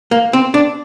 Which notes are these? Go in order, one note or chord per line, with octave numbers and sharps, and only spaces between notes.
A#3
C4
D4